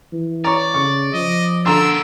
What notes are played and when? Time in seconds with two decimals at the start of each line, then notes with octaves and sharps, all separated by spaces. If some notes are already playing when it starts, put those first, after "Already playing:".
0.13 E3
0.44 C#5 D5 A#5
0.74 C#3 C#6
1.14 F3 D#5
1.66 D3 D4 A#4 A#5 C6 E6